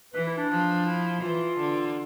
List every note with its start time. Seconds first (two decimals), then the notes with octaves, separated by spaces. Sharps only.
0.14 E3 B4
0.27 E4
0.38 D4
0.50 F3
0.85 E4
1.21 E3 F4
1.57 D3